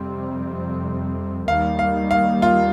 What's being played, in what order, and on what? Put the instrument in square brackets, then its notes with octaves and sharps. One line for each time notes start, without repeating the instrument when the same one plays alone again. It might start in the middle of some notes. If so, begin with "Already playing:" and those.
Already playing: [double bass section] F2 C3 G3 C4
[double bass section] D#2 D#3 G3 A#3 [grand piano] F5
[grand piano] F5
F5
F4